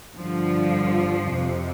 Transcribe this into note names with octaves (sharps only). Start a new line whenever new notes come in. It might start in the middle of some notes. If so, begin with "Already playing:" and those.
G2 D3 F3
F2 C3